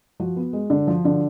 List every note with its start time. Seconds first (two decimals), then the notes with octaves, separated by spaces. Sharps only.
0.20 F3 F#4
0.36 B3
0.53 G#3
0.70 D3
0.87 F3
1.05 D3